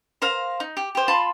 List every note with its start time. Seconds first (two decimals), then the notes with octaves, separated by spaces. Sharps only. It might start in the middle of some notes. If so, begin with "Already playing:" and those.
0.22 A#4 C5 F5 A#5
0.60 D#4
0.77 G4
0.95 G4 C5
1.08 F4 A5 B5 C6